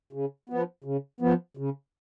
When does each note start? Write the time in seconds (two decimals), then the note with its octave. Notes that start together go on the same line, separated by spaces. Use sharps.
0.13 C#3
0.50 F3 B3
0.84 C#3
1.20 F3 B3
1.57 C#3